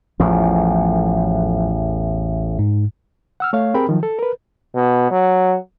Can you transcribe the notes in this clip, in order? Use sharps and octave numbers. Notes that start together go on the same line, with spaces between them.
A1 E2 A2 F3
G#2
F#5 E6 F6
A3 C#5 F5
C4 G4 G#4 A#4 G5 B5
D#3 F3 F#3
A4
A#4 B4
B2
F#3